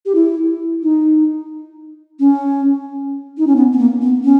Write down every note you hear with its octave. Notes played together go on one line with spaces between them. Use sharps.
G4
E4
D#4
C#4
D#4
C#4
B3
B3
A#3
B3
C#4